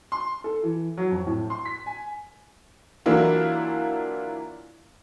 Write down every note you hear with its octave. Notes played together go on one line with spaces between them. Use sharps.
C6
A4
E3
F#3
F2
A2
C6
B6
G#5
E3 F#3 A#3 D4 E4 F4